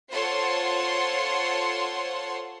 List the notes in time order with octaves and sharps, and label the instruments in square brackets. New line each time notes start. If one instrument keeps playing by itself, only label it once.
[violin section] F4 A4 C5 C#5 F#5 C6